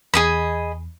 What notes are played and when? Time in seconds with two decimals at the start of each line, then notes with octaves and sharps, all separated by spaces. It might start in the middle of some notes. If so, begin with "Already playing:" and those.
0.14 E2 G#4 D#5 B5